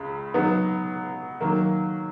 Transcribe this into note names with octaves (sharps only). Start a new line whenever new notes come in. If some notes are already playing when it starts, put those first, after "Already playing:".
Already playing: C#2 C#3
F#3 B3 D#4
D#3 F#3 A#3